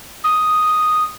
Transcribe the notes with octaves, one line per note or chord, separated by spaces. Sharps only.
D#6